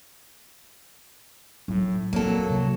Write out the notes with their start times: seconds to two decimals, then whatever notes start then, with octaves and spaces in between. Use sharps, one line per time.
1.68 A2 F#3
2.13 D#1 F#3 A#3 C4 A4
2.49 C3 F3